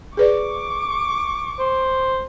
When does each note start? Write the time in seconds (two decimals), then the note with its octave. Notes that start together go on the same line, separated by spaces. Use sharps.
0.17 G#4 B4 D5 C#6 D6
1.59 C5